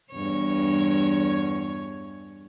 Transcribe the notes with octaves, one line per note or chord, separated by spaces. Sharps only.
E2 G2 C#5